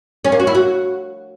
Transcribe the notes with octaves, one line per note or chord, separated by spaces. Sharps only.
C#4
A#3
F#4
E4
F#4